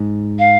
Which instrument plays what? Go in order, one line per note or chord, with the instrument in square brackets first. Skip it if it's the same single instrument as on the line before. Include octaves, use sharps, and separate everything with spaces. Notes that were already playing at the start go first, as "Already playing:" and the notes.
Already playing: [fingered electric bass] G#2
[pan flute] F5